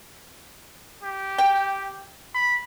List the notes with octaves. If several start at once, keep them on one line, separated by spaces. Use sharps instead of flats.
G4
G5
B5